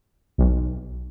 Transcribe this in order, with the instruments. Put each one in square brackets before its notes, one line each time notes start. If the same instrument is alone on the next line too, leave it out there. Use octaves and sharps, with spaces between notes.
[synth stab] B1